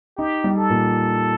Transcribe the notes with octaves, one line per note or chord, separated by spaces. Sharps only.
D#4 G4
G3
A4
A#2